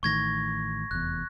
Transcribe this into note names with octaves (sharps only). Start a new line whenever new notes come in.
A1 A2 D#3 C#6 G#6 A#6
F1 E2 F#6